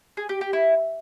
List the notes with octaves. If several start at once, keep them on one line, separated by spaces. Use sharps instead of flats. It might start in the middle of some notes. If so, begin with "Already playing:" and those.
G#4
G4
G4
E4